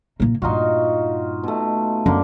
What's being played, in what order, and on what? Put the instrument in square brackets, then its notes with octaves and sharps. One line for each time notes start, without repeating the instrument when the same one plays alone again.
[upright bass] A#2 A#3
[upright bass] G2 A#2 [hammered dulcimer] D#4 F4 F#4
[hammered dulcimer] B2 A3
[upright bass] F#2 [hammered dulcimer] D3 A#3